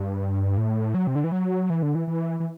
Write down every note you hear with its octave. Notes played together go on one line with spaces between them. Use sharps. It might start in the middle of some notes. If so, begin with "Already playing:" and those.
Already playing: G2
A2
F#3
C3
D3
E3
F#3
E3
D3
E3
E3
E3